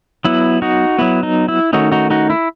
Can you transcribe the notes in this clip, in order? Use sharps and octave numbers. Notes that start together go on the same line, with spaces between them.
F#3 B3 E4
D#4 F#4
F#3 B3 E4
D#4
E4
D#3 A3 C#4 D#4 F#4
D#4 F#4
D#4 F#4
E4